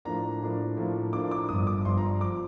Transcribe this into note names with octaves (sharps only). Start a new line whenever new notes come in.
A2 F3 A#3 D4 A#5
A2 F3 A#3 D4
A2 F3 A#3 D4
A2 F3 A#3 D4 D6
D6
G1 G2 F3 D#6
D6
G1 G2 F3 C6
A#5
F3 D6